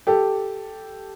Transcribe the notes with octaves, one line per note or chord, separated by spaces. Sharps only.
G4 A4